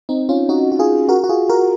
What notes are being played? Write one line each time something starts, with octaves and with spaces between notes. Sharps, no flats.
C4 D#4
C#4 F4
D#4 F#4
F#4
F4 G#4
F#4 A#4
F#4
F4 G#4
F#4 A#4